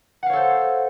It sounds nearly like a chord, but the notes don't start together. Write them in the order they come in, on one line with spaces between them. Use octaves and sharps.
F#5 F5 C#5 A4 C5